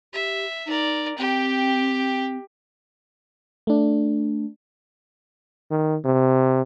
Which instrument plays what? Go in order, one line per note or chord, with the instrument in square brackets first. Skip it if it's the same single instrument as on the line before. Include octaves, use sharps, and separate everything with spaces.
[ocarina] G4 [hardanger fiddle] E5
[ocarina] D#4 [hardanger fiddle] A#4 D5
[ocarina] C4 [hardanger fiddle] G4 G5
[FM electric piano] A3 D4
[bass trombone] D#3
C3